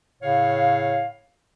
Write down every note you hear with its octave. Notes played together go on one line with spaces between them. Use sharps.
A2 C#3 C#5 F5